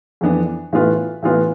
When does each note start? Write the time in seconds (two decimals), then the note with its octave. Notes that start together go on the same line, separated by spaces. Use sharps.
0.21 F2 E3 B3 D4
0.73 A2 E3 B3 F4 B4
1.23 A2 E3 B3 F4 B4